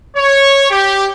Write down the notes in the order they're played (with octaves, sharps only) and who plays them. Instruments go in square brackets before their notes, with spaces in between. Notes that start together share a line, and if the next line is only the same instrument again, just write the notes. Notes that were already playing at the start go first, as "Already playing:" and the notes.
[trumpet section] C#5
G4